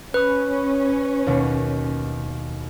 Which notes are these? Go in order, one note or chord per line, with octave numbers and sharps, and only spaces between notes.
C#4 B4 B5 D#6
D#2 B2